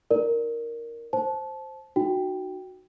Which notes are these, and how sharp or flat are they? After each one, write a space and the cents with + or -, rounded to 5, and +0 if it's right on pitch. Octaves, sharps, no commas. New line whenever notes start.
D#4 +0 A#4 +0 D5 +0
C5 +5 A5 -20
D#4 -25 F#4 +0 G5 +0